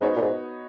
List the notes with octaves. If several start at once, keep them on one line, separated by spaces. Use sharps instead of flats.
G#2 B3 D#4 F#4 C#5
A#2
G#2